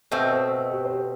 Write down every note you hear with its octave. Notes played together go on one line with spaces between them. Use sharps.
B2 A3 C4 B4 D#5
A4 C5
B4 D#5
G4 B4
C5
G4 B4